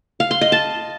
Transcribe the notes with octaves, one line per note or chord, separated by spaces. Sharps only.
F5
C6
D#5
A5